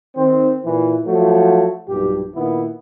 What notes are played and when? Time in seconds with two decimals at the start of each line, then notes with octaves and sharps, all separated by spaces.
0.16 D#3 C4
0.65 A#2 E3
1.06 F3 F#3 A3
1.89 B1 G2 A#2 G4
2.35 A#2 D#3 B3 E4